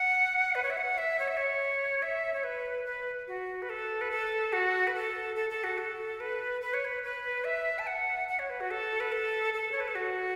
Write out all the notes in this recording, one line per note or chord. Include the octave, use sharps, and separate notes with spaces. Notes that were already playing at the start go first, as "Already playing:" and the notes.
Already playing: F#5
B4
C#5
E5
F#5
E5
C#5
E5
C#5
E5
C#5
B4
B4
F#4
B4
A4
B4
A4
F#4
B4
A4
A4
A4
F#4
A4
B4
B4
C#5
B4
B4
E5
A5
F#5
F#5
C#5
B4
F#4
A4
B4
A4
A4
C#5
B4
A4
F#4